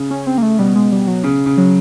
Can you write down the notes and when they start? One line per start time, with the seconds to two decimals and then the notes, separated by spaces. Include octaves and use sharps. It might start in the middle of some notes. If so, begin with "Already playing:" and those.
Already playing: C#3
0.10 C#4
0.26 C4
0.38 A#3
0.43 A3
0.59 B2 G3
0.75 G#3
0.92 G3
1.07 F#3
1.24 C#3
1.46 C#3
1.57 F#3